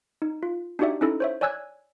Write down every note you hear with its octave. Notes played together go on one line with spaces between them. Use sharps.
D#4
F4
D4 D#4 F#4 G4 D5 E5
C#4 D#4 E4 A4
C5 C#5 E5
C#5 D5 G#5 E6 F#6 G#6